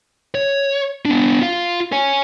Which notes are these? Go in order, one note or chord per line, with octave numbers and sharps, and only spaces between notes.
C#5
B3 D4
F4 F5
C#5 G#5